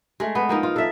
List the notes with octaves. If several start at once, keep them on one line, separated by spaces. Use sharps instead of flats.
G#3 A3
B3
F3 A#3 D#4
F4
A4 E5